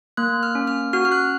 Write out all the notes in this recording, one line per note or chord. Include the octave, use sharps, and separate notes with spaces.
A#3 F#6
F6
C#4
F6
F#4 F6
F6
F#6